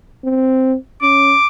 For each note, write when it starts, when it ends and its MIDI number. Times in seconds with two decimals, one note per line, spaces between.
0.25 0.76 60
1.02 1.35 61
1.02 1.47 86